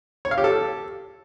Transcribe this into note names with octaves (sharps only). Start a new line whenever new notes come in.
C#5
F5
G4
A4